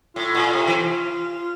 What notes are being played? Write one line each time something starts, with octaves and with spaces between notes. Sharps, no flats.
A2 F4
A#2
C3
E3